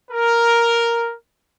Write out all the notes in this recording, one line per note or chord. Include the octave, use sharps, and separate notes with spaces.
A#4